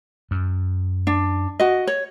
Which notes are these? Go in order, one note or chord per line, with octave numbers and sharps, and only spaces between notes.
F#2
D4
F#4 D#5
C#5